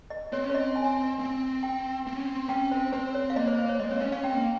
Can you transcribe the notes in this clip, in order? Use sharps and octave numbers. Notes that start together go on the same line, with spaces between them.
D#5
C4 C#5
C#4
C#5
C4 D#5
G#5
C4
G5
C4
C#4
C4
C#4 G5
C4 C5
C4 C5
C#5
F5
A#3 D#5
C5
C5
C#5
G#3 D#5
C4 C#5
C#4 C#5
C#4 F5
C4 G5
A#3